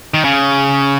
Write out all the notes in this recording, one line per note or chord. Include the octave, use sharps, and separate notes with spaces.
D#3
C#3